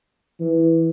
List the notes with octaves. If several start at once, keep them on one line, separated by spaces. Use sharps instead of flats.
E3